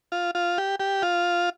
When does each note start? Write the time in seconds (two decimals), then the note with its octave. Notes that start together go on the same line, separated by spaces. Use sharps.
0.12 F4
0.35 F4
0.58 G4
0.80 G4
1.02 F4